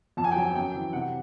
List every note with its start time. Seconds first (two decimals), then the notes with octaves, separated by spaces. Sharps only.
0.17 F2 A5
0.24 G#5
0.31 G5
0.36 F#3 G#5
0.55 F#2 G5
0.74 E3
0.93 C3 F#5